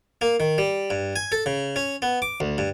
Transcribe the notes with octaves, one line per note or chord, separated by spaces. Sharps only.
A#3
D#3
G3
G2
G#5
A4
C#3
C#4
B3
D6
D2
G2